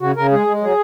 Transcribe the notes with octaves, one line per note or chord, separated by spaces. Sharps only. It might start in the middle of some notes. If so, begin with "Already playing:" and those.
C#3 F#4
C#3 A#4
G#3 G#4
G#3
F#3 G#4